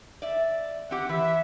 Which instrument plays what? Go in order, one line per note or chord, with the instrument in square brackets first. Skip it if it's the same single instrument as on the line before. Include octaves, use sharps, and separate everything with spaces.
[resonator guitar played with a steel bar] D5 E5
[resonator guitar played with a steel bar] C4 G4 [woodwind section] F#5
[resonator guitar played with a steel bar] E3 [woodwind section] E5